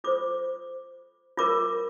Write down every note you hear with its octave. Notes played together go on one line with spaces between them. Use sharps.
F4 A4 C5 D6
F4 A#4 D6